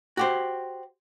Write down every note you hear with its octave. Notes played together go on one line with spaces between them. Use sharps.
F#4 G4 C5